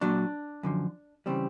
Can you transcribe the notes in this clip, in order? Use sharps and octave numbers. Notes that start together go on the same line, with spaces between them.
A#2 F#3 D4
F#2 D3 F3
C#3 E3 G3 C4